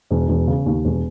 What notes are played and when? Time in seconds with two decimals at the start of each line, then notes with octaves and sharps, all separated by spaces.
0.11 E1
0.29 E1
0.47 C#3
0.66 D#2
0.85 E1